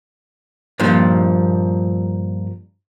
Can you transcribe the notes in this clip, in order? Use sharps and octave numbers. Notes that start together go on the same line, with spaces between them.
G2 A#2 F3